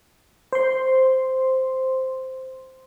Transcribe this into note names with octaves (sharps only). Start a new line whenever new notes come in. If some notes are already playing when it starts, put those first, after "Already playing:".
C5 C6